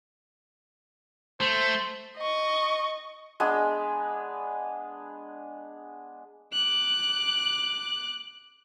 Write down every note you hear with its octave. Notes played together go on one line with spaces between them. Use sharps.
A3 C5
D#5 C#6
G#3 B3 D4 G#4
D6 F#6